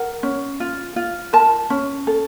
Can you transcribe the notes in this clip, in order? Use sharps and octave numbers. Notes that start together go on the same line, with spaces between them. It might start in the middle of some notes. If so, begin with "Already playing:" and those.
Already playing: A#4 F#5
C#4
F4
F4
A#4 A5
C#4
A4